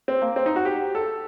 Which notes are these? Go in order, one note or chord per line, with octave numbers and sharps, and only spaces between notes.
C4
A#3
C4
D#4
F#4
G4
A4